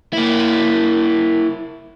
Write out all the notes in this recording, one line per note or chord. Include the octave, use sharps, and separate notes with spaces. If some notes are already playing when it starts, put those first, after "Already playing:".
A#3 E4